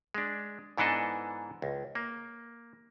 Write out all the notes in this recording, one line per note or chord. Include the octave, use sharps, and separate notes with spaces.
G#3 D4
G#2 E3 B3 D4 A4 D#5
C#2
A#3